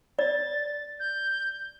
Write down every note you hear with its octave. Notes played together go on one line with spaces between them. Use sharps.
D5 A6
G6